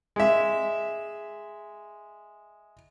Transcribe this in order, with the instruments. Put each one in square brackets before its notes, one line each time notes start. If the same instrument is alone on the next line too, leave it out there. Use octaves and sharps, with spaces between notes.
[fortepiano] G#3 E5